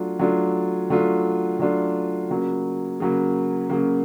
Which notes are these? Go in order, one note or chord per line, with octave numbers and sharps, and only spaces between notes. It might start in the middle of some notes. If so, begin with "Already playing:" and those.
Already playing: F#3 A3 D4 F4
F#3 A3 D4 F4
F#3 A3 D4 F4
F#3 A3 D4 F4
C#3 F#3 A#3
C#3 F#3 A#3
C#3 F#3 A#3